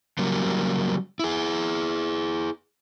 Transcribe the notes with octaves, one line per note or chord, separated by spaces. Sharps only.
C#3 F#3 G3 A#3
E4 G#4